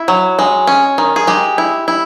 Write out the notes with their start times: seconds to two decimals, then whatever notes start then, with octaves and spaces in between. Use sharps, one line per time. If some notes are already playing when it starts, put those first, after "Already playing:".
Already playing: E4
0.08 F#3
0.39 G#3
0.67 C#4
0.98 D#3
1.16 G#4
1.27 G#3 G4
1.58 E4
1.88 E4